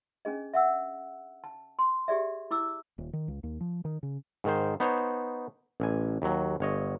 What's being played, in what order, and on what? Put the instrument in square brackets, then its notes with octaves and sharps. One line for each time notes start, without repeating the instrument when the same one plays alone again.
[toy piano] C#4 D4 G#4 D#5
E5 F#5 E6
A5
C6
G4 G#4 D5 E5
E4 D6 E6
[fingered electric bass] D#1
D#3
C#2
D#2
F3
D#3
C#3
[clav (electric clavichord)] G#2 D#3 C5
B3 D#4 C5 C#5
A1 G#5
D#2 F#3
G1 C#5 D#5